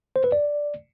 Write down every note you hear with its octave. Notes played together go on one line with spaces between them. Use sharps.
C5
B4
D5